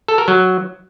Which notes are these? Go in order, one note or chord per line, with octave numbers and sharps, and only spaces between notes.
A4
A#4
F#3